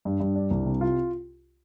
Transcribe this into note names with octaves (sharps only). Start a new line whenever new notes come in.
G2
G2
D4
C2
C3
F4